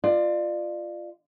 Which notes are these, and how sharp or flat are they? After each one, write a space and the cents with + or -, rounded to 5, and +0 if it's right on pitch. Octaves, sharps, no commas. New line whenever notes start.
F4 -10 D5 +30